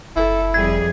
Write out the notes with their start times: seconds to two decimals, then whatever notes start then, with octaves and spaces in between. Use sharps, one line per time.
0.16 F#1 E4 A4
0.54 F2 G3 G#4 G#6